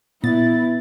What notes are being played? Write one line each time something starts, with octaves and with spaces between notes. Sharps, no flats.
A#2 B3 E4 A6